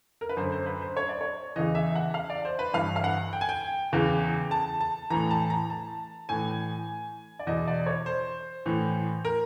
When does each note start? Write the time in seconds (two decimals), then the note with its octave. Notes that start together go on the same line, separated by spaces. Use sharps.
0.21 A#4
0.29 B4
0.37 F#2 D3 C5
0.52 C5
0.66 B4
0.82 C5
0.97 C#5
1.09 D5
1.21 C#5
1.56 E2 C#3 E3 D#5
1.75 E5
1.96 F#5
2.14 F5
2.30 D5
2.45 C5
2.59 B4
2.73 G2 E3 F5
2.96 F5
3.04 F#5
3.33 G5
3.41 G#5
3.49 G5
3.93 E2 C#3 E3
4.51 A5
4.80 A5
5.10 A2 E3 A#5
5.30 A5
5.50 A#5
5.70 A5
6.29 A2 E3 G#5
7.39 D5
7.47 E2 B2 D#5
7.68 D5
7.86 C#5
8.06 C5
8.66 A2 E3
9.25 A#4